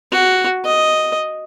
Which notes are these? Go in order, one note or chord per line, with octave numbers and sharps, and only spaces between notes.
F#4
D#5